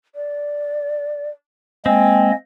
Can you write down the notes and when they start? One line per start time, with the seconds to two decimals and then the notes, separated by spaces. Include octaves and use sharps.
0.15 D5
1.86 G#3 A#3 C4 D#5 G5 G#5